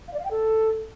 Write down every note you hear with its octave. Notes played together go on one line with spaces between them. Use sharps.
F5
D5
F5
G5
A4